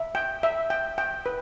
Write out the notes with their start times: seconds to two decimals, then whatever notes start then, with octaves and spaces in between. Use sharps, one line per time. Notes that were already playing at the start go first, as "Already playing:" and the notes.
Already playing: E5
0.15 G5
0.43 E5
0.70 G5
0.98 G5
1.26 B4